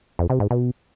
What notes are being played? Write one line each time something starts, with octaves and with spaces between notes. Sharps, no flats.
F2
C3
G#2
B2